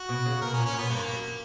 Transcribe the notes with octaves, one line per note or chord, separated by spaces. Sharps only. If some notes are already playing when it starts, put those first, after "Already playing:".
Already playing: F#4
B2
C#3
B2 A#4
C#4
A#2
C#4
A#2
B3
G2 A#3
F#2